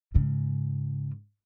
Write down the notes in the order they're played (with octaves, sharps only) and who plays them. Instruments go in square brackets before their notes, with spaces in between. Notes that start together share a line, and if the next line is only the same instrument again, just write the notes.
[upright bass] G#2 C#3